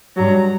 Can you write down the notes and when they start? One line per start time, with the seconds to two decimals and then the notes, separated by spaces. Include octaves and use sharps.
0.16 G2 F#3 A#5